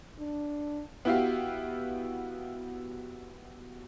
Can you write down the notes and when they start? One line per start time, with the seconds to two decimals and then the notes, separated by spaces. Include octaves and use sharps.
0.19 D4
1.05 B3 E4 F#4 G4 F5